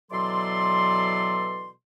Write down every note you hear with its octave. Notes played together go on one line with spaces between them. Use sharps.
B2 E3 F#3 A4 D5 C6